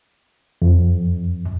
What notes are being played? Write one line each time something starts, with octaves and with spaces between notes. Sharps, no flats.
F2